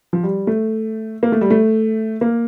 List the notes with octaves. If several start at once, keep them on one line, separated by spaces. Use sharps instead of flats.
F3
G3
A3
A#3
A3
G3
A3
A#3